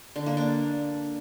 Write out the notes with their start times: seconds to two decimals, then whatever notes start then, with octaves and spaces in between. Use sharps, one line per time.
0.16 D3
0.26 A#3
0.37 D4